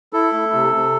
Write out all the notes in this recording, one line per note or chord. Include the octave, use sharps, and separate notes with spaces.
E4 A4
A3
C3
C3